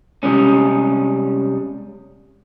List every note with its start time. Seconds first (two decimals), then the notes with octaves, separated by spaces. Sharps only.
0.23 C3 G3 G#3 C#4